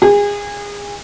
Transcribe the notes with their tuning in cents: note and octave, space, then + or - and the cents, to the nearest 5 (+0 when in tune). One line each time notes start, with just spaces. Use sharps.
G#4 -30